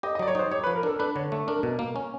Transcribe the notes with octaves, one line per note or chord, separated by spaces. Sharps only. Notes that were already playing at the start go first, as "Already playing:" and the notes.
G4 D#5
D#5
F#3 D5
C#5
D#4 C5
G4 C#5
B4
F3
A#4
D4 A4
D4 B4
D3 C#5
A3
D4 A#4
B2
A#3
C#4